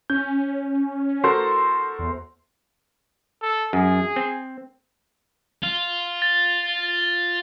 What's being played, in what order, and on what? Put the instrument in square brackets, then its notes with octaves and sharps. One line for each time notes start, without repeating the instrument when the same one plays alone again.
[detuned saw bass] C#4 [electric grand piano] G6
[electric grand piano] F#4 A4 A#4 [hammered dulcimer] C5
[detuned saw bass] E2
[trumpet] A4
[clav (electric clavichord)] F#2 [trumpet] G#4
[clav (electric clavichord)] C4
[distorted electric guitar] F4
[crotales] A6